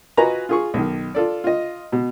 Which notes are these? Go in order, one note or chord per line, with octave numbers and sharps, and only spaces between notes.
F4 F#4 B4 D#5 G#5 A#5
F4 G#4 C#6
B1 D#3
F4 A4 D5
F4 D#5
B2